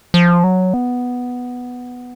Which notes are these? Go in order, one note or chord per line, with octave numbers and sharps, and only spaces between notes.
F3
F#3
B3